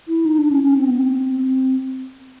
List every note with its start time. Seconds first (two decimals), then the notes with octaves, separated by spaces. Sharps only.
0.08 E4
0.26 D#4
0.39 D4
0.51 C#4
0.63 C#4
0.77 C4
0.88 B3
0.99 C4